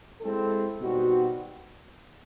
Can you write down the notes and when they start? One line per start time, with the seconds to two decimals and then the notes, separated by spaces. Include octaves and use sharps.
0.21 G#3 C4 E4 A4
0.80 B2 G3 C4 D#4 F#4